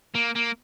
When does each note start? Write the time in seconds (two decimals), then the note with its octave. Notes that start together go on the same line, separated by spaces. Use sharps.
0.15 A#3
0.35 A#3